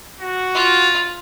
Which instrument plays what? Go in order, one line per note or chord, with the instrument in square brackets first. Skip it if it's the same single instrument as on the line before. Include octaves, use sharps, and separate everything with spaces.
[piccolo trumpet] F#4
[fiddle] F4